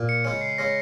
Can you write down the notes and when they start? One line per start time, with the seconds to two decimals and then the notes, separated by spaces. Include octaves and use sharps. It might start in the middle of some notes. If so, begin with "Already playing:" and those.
Already playing: A#2
0.09 C#7
0.24 C#3 G#3 C#4 C#7
0.41 C7
0.58 C#3 G#3 C#4 A#6